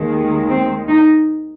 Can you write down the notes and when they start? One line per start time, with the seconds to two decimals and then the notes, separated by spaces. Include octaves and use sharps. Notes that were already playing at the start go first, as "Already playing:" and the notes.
Already playing: D#2 D#3 G#3
0.49 C4
0.88 D#4